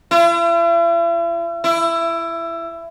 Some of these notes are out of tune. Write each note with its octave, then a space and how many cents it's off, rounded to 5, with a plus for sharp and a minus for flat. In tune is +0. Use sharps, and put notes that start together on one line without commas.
E4 +45
E4 +20